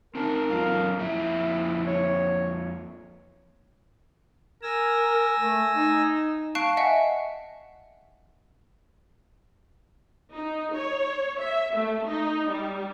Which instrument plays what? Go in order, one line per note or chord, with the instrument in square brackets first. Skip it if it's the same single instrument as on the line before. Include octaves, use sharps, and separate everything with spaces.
[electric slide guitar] C4 D#4 A5 [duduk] A#4
[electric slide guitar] F#2 F4
[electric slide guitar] F2 A#3 E5 [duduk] E4
[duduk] C#5
[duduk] A#4 [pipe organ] G#5 E6 A#6
[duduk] A3
D#4
[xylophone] F5 A5 C#6 F#6 C7 D7
D#5 E5 F#5 G#5
[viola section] D#4
C#5
E5
A3
D#4
G3